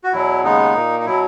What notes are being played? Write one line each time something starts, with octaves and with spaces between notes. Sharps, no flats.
F#4
E2 B2 F#3 E4
D#2 C#3 G#3 B3 D#4
A#2 A#3
D#4
B2 F#3 E4